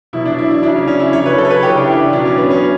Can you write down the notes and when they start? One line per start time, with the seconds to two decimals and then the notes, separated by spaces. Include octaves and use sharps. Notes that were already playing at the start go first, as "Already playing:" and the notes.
0.13 B2 F#3 E4
0.25 D4
0.39 E4
0.51 E4
0.62 C#3 F#3 D4
0.76 C#4
0.88 C#4
1.00 E4
1.13 C#3 F#3 C#5
1.26 B4
1.38 A4
1.45 C#5
1.50 B4
1.63 C#3 G4
1.67 E3
1.77 D4
1.88 E4
2.13 B2 F#3 D4
2.25 C#4
2.38 B3
2.50 C#4